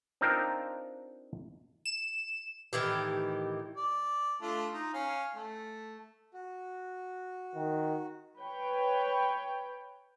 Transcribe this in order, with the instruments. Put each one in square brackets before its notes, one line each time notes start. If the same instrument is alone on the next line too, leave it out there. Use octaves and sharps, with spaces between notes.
[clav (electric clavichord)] C4 D4 D#4 F4 A#4 C5
[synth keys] E7
[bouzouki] A2 D#3 E3 G4
[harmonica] D5
A3 D4 F4
D#4
C#4 F5
A3
[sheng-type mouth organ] F#4
[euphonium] D#3
[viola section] B4 C#5 G5